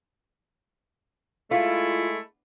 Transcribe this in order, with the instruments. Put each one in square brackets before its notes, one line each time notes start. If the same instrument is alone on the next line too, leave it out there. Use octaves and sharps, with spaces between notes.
[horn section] G#3 A3 E4 [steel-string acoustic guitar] F4